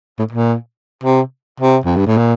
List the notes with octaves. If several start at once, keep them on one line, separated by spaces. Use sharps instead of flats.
A2
A#2
C3
C3
F2
G2
A2
A#2